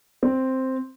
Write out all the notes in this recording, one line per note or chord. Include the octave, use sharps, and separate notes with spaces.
C4